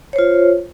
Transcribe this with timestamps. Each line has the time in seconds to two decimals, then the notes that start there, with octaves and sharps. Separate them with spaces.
0.13 C#5
0.16 C5
0.18 F4